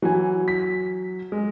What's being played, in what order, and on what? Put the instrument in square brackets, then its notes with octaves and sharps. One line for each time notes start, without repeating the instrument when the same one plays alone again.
[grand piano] E3 G#5 [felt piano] F#3
[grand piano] B6
G#3